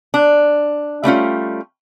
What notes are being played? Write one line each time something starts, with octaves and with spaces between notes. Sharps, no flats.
D4
G3 A3 C#4 F4